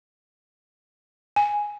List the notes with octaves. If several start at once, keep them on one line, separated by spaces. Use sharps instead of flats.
G#5